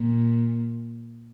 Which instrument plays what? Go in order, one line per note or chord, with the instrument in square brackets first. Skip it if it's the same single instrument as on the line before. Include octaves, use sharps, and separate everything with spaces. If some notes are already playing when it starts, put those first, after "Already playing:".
Already playing: [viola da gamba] A#2